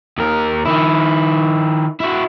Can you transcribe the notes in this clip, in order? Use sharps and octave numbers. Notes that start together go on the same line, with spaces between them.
D#2 A#4
D#3 E4
E4 F#4